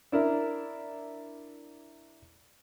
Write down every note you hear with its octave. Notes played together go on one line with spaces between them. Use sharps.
D4 E4 A#4